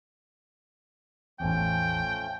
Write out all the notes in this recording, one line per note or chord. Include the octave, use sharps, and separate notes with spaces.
A1 E2 F3 A3 C#4 G5